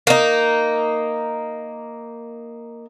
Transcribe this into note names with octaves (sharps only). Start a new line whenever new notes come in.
A#3 D#4